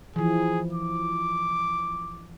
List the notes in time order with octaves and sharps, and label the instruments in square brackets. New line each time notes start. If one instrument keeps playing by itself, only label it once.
[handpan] E3 F3 [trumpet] G#4
[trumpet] D6